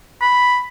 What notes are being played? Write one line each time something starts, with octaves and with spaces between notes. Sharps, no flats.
B5